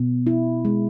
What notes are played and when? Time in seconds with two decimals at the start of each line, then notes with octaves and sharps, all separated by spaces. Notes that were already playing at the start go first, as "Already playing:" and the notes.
Already playing: B2
0.27 E4
0.65 G#3